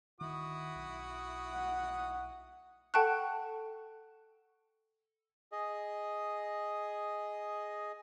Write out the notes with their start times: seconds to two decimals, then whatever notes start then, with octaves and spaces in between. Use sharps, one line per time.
0.21 D1 D#3 E4 F#4 D#6
0.75 B1
1.52 F#5
2.94 A4 F#5 G5 A5 C#6 F#6
5.52 G#4 D#5